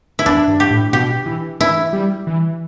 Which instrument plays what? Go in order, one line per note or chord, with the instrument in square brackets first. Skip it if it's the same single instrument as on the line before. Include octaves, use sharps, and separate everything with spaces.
[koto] E4
[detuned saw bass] E2 [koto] D4
[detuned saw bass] G2
[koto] G4
[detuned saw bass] A2
[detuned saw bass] B2 [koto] G4
[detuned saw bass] E3
[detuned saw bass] E3 [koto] E4
[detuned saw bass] G3
E3